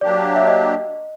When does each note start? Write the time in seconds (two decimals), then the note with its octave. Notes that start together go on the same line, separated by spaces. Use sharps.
0.01 F#3 A#3 D4 G4 D5
0.36 E5
0.47 D#5